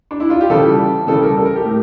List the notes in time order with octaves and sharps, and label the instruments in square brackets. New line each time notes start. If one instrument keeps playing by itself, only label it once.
[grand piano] D4
E4
F4
G4
C#3 E3 G3 A4
C#3 E3 G3 A4
A#4
A4
A#4
G4
A2